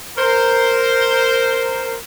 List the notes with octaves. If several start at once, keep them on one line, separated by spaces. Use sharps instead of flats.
A#4 C5